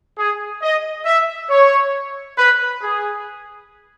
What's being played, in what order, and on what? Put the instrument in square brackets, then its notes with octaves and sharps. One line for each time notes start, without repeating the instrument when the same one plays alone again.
[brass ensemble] G#4
D#5
E5
C#5
B4
G#4